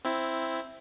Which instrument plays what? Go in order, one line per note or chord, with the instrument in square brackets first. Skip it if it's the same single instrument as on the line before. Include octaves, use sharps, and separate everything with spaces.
[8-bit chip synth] C4 E4